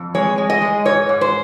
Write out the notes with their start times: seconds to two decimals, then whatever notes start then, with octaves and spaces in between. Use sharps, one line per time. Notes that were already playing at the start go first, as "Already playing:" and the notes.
Already playing: F2
0.15 G#3 C#5
0.38 G#3
0.50 D#5
0.62 G#3
0.85 G#2 C#5
1.09 G#2
1.21 C5